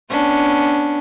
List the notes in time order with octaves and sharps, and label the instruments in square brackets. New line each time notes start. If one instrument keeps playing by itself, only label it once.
[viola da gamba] B3 C#4 D4